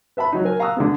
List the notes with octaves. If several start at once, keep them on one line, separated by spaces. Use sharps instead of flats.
B4 E5 A5 B5
F#3 D#4
A#4 G#5
F5 A#5 C#6 D#6 E6 F#6
D3 G#3 B3